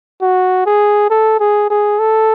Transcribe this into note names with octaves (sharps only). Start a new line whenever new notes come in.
F#4
G#4
A4
G#4
G#4
A4